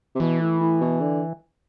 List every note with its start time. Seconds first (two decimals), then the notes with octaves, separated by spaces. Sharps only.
0.15 C3
0.20 B2 E3
0.40 A2
0.61 A2
0.81 B2
1.01 D3